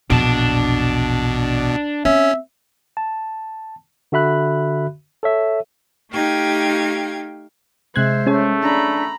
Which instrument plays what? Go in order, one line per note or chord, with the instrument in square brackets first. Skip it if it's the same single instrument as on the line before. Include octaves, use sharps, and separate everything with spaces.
[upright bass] A#1 E2 [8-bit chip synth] B2 [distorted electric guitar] D4 A5
[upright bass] C4 [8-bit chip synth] C#4 [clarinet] E5
[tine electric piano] A5
D3 F#4 E5 B5 F#6
A4 C#5 E5
[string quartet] A3 D#4 G4 F5 G5 G#6
[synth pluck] C3 F#6 G#6 [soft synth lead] G#3 [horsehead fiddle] C5 E5
[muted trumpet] A3 [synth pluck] C#4 G#4 C#5
[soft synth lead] D4 [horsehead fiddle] A#5 B5